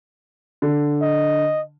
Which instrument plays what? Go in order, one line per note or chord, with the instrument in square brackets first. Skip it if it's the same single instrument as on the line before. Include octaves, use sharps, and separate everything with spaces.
[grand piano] D3
[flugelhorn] D#5